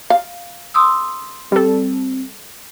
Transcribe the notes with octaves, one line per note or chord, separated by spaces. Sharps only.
F5
C6 D#6 E6
G3 C4 A4